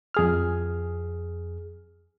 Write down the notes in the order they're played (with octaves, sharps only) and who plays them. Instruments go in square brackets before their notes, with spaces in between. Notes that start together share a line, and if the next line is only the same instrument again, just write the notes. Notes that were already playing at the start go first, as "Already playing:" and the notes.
[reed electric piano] F2 G#4 F6